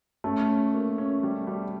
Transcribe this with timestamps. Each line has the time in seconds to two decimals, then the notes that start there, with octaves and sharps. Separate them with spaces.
0.24 A3 C#4
0.49 C#4
0.74 A#3
0.98 C#4
1.23 G3
1.47 G3